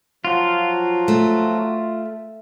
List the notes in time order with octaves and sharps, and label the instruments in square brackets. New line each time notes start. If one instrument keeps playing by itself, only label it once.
[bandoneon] F3 F#3 F#4 [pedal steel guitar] F4
[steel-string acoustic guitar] A3